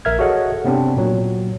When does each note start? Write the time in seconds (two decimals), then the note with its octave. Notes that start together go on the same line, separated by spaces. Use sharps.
0.05 A#1 A#4 E5 F6 G#6
0.19 F#4 G#4 A4 C#5 D#5 F#5
0.65 C3 B3 C4 D4
0.97 A#2 F#3